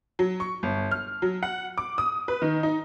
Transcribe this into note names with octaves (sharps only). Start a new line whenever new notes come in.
F#3
C#6
G1
F6
F#3
F#5
D6
D#6
B4
D#3
D#4